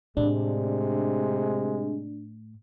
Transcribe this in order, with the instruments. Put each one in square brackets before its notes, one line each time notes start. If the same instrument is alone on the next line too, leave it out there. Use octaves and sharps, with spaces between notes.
[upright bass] A2 [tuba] C3 [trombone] G#3 [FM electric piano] D4